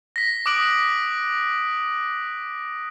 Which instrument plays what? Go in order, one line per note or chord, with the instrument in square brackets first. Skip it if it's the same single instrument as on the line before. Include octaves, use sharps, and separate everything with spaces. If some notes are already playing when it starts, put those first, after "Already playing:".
[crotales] A#6 B6
D6 D#6 F#6 D7 F#7